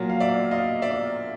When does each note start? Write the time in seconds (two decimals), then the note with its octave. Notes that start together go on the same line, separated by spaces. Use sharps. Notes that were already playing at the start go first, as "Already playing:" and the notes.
Already playing: A#2 F#3 A#3
0.10 F5
0.20 D5 E5
0.51 D#5 F5
0.82 D5 E5